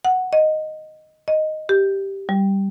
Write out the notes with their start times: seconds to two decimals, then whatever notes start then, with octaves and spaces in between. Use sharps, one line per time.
0.05 F#5
0.33 D#5
1.28 D#5
1.69 G4
2.29 G3